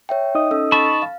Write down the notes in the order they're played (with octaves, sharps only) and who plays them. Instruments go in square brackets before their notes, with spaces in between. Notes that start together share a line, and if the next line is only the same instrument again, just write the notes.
[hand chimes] C#5 E5 G5
[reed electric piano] D#4 D#5 D#6
[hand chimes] C#4 A4 E6
[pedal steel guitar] A5 B5 C#6 [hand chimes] A6
[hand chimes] F5